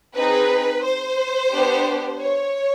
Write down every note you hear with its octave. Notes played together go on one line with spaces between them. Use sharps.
C4 D#4 G#4 B4
C5
B3 D4 G4
C#5